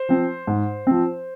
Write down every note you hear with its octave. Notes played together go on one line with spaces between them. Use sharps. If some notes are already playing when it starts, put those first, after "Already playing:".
Already playing: C5
F3 C4
G#2
F3 C4